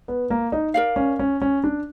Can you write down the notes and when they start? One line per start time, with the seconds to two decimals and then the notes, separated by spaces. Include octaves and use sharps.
0.08 B3
0.30 A#3
0.52 D#4
0.74 A#4 D5 F5
0.96 C#4
1.19 C#4
1.42 C#4
1.64 D4